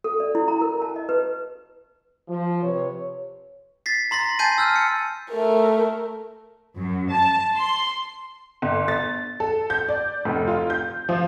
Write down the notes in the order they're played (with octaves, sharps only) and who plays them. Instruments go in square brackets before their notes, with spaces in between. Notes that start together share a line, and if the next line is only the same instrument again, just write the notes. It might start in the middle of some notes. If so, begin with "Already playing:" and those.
[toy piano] A4
D5
E4
A#5
A#4
A5
D#5
B4
[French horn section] F3
C3 B4 C#5
[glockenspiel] A6 B6 C7
A#5 C6 A6 A#6
G#5 A5 G6 A6 C7 D#7
E6 F6 G6
C#7
[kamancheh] A3 A#4
[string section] F#2
A5
C6
[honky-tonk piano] G1
A6
A4
G6
D5
F1
F4
G6
F3